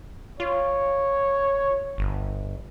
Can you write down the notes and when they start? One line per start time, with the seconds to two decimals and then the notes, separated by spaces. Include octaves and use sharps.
0.40 F4 C#5
1.98 G1